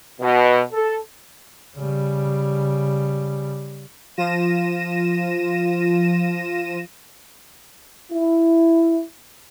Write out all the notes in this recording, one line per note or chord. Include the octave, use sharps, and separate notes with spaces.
B2
A4
C#3 G3
F3 F4 A#6 D#7 E7
E4